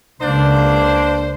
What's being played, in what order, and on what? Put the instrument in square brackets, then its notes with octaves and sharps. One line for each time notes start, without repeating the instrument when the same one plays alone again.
[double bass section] C#2 [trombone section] A#3 D4 [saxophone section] C5